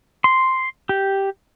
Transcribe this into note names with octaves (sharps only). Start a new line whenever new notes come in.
C6
G4